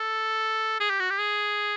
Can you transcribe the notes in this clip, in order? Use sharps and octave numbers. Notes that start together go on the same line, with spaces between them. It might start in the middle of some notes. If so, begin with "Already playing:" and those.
Already playing: A4
G#4
G4
F#4
G4
G#4